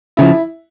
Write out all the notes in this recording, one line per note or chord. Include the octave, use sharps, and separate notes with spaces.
C#3 F3 E4